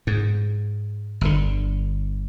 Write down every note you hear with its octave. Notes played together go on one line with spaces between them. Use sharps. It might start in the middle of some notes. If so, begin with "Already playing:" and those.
G#2
G1 D3